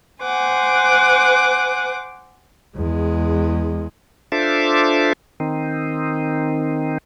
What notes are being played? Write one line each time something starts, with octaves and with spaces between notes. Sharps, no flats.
C5 F#5 G#5 D6
E2 G#3
D4 F4 A4 C5 E5 D6
D#3 C4 D#4